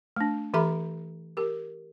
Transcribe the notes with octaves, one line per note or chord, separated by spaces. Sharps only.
A3 D4
E3 G4 A4 E5 A#5 B5
G4 A#4